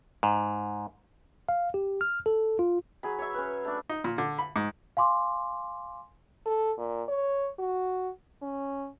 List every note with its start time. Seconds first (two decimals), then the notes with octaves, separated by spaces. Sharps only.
0.23 G#2
1.49 F5
1.74 G4
2.01 F6
2.26 A4
2.59 F4
3.03 F#3 G#4 B5
3.19 C#5 E5
3.34 C#4 B4
3.65 A3 D4
3.89 D#4
4.04 A#2
4.18 D3
4.39 B5
4.56 G#2
4.97 F5 G#5 C6 D6
6.46 A4
6.78 A#2
7.08 C#5
7.59 F#4
8.42 C#4